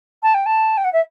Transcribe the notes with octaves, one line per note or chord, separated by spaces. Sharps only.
A5
G5
A5
G5
F#5
E5